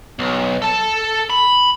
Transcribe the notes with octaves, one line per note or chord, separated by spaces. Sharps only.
B1
A4 A5
B5